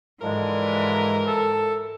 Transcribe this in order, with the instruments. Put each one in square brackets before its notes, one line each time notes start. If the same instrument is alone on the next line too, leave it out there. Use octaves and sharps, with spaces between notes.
[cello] G#2 E3 [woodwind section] D3 F3 G#3 [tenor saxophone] A#4
[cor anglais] A4